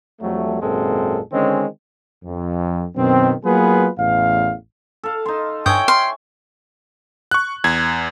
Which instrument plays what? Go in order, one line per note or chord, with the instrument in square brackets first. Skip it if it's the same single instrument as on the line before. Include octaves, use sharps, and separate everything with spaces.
[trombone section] F2 F#3 G3 A3
G#1 F#2 A#2 G#3 C4 A4
D3 D#3 G#3 C4 C#4
[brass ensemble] F2
F#2 B2 D#3 C4
F#3 A#3 B3 F4 G#4 B4
A1 E2 F5
[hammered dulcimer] A4 F5
D#4 C6
[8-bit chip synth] G2 D#6 G6 [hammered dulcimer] C#5 E5 G#5 [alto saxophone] G5
[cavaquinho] C6 [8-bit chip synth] F6
[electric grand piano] C#6 F#6
E2 G#6